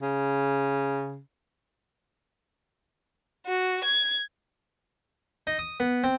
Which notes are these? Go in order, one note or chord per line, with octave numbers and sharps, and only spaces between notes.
C#3
F#4
G#6
D#4
D#6
B3
C4